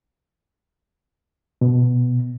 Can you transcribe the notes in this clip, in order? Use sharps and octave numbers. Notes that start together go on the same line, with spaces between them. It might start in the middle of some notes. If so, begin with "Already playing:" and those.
B2